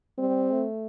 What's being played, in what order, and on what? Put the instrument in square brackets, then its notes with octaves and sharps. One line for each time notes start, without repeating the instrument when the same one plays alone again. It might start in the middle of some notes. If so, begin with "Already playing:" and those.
[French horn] G3 [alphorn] C4
[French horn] A3